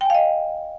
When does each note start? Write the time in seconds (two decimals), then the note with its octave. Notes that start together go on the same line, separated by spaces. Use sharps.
0.01 G5
0.05 G#5
0.10 F5
0.15 D#5